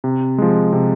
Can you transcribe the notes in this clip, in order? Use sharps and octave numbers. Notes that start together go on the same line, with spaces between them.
C3
F3 G#3
C3